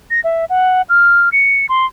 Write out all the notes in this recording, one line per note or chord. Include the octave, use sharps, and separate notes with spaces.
A#6
E5
F#5
F6
C#7
C6